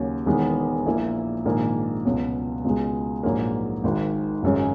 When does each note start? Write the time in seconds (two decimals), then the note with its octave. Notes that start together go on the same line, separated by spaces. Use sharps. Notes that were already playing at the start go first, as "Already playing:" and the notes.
Already playing: D#2 C#3 F#3 C#4
0.26 E1 E2 D#3 G#3 B3
0.86 A#1 A#2 A#3 E4
1.45 A#1 G#2 D#3 A#3
2.05 C#2 B2 F#3
2.64 C#2 B2 G#3
3.23 A#1 G#2 F#3 A#3
3.84 G#1 G#2 D#3
4.43 G#1 F#2 C#3 G#3